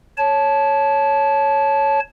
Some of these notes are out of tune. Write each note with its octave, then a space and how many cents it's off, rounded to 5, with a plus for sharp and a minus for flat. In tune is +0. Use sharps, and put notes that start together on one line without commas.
C#5 +0 A5 -15